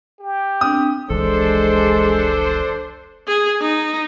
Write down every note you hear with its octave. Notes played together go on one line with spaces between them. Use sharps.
G4
C4 D4 D#6
F1 C2 E3 G#3 D4 A4 C5
G#4
D#4